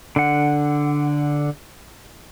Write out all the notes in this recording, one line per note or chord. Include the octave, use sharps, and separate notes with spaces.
D3 F#5